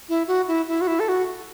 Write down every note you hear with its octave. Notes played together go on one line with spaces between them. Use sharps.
E4
F#4
E4
E4
F#4
E4
A4
F#4